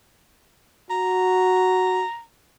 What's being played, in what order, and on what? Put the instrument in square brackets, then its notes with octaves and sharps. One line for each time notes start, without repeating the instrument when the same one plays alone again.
[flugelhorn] F#4 [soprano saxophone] A#5